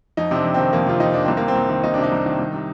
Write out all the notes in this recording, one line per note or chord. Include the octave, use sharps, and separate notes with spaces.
F2 D#4
C3 C4 D4
F2
D#3 C4
F2 A#3
C3 F4
F2 D#4
D#3 D4
C2 C4
C3 A#3
C4
C2
D#3
C2 D#4
C3 D4
D#4
C2
D#3
C2
C3